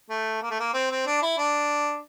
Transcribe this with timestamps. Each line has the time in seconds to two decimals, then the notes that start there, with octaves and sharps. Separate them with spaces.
0.10 A3
0.42 A#3
0.50 A3
0.60 A#3
0.74 C4
0.90 C4
1.07 D4
1.22 E4
1.38 D4